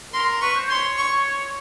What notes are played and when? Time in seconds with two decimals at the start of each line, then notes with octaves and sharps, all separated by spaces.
0.13 A#4 C6
0.41 B4 C#6
0.56 C5
0.69 C#5 C6
0.98 C#6